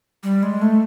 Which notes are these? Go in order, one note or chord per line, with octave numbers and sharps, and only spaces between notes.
G3
G#3
A3